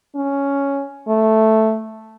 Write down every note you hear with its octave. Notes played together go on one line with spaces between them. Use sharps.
C#4
A3